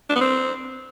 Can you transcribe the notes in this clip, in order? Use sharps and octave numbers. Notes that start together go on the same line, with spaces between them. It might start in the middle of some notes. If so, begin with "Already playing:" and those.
D4
B3
C4